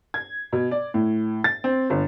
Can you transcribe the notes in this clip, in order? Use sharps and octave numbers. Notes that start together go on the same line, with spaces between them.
G#6
B2
D5
A2
A6
C4
G1